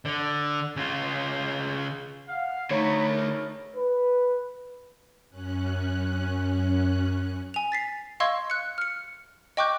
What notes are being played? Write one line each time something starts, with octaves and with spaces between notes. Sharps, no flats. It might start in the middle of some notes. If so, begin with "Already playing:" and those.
D3
C#3 F4
F5 F#5
D3 A3 D#4 C#5 A#5 B5
G#3 E4 A#4
B4
F#2 C#4 F#6
G#5 F7
A6 B6 C7
D#5 F5 C6 C#6 E6 G#6
F#6 C#7
F6 C#7
D#5 G5 C#6 D6 F#6 G6